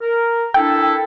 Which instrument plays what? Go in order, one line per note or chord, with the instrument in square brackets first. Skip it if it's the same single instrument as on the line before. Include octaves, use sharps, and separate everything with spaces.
[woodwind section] A#4
[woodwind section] D4 E4 A4 [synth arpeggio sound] G5